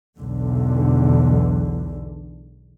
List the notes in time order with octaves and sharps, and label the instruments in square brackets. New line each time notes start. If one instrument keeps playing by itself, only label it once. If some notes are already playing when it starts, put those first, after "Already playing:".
[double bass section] B1 E2 D3